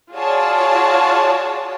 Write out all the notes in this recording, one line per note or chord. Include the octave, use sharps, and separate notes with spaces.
F4 F#4 G#4 C#5 D5 A5